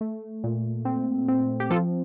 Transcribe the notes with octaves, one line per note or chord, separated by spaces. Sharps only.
A3
A#2
C4
C4
G4
F3 F4 A4